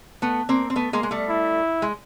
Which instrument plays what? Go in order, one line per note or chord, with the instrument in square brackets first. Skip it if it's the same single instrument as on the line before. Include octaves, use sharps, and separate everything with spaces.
[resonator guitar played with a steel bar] A3 B3
A#3 C4
C4
A3 B3
G#3 A#3
G#3
G3 A3
[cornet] E4
[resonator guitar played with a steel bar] G#3